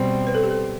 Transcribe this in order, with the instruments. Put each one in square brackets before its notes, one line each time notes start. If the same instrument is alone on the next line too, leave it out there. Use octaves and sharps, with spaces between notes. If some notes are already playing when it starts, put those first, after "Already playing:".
Already playing: [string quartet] B2 G3 C4
[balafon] B4
A4
G4
A4